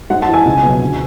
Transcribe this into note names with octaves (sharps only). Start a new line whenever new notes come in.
G#2 F#5
A5
E3
G#5
C#2
B2 F#3
D2